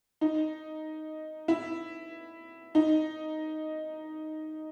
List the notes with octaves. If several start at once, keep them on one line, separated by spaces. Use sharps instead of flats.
D#4
E4
D#4